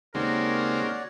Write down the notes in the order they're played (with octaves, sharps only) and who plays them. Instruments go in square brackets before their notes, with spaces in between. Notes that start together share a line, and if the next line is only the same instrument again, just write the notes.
[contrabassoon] D#2 [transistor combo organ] C#3 G#3 C4 [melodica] F#4 C#5 D5 [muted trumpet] A#4